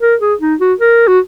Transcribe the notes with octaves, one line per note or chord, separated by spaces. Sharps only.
A#4
G#4
D#4
F#4
A#4
F#4